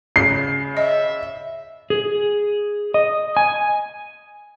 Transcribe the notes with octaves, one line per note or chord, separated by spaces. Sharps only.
C#3 C7
D#5 E5
G#4
D#5
G#5